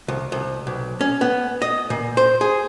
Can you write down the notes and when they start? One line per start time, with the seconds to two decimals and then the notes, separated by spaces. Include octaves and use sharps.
0.08 C2
0.32 C2
0.67 B1
1.01 C#4
1.21 B3
1.62 D#5
1.90 A#2
2.17 C5
2.41 G#4